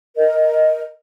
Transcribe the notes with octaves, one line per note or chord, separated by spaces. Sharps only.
A#4 D#5